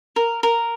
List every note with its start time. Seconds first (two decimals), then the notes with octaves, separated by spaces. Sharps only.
0.16 A#4
0.43 A#4